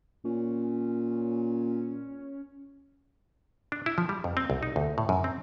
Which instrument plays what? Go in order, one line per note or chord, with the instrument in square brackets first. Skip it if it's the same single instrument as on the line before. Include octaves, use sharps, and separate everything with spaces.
[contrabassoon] A#2 [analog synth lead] C#4
[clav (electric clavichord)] D4
E4
F3
G3
F2
C4
C2
D#4
D2
A2
F#2
C4